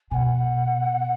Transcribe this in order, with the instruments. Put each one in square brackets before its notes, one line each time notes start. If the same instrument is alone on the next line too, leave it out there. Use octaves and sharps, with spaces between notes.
[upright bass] B2 [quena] F#5 G#5